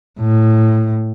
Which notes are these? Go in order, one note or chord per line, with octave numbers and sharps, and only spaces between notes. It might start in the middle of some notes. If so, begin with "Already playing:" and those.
A2